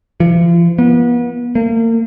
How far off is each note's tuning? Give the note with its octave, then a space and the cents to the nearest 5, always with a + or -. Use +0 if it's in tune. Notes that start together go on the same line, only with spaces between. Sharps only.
F3 -40
B3 -35
A#3 -35